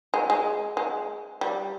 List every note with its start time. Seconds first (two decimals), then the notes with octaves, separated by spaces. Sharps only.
0.14 G#3
0.30 G#3
0.77 G#3
1.41 G3